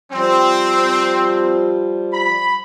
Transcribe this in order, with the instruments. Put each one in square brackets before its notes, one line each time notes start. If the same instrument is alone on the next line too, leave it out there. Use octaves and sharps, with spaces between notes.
[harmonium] F3 G3 [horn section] C4
[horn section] B5